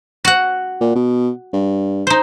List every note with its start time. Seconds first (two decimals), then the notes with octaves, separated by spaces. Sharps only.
0.25 F#4 F#5
0.81 A#2
0.95 B2
1.53 G2
2.07 D#4 C5